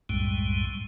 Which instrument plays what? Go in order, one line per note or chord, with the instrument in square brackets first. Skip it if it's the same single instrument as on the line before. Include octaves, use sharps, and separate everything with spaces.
[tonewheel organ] C2 F#2 A2 G3 G#3